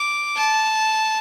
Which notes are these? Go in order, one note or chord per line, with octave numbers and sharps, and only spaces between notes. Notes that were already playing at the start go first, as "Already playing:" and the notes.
Already playing: D6
A5